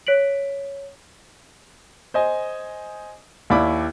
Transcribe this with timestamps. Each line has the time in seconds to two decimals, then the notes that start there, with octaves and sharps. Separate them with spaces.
0.07 C#5 B6 D7 F#7
2.14 C5 D#5 G#5
3.50 D#2 E4 D5 B5 D6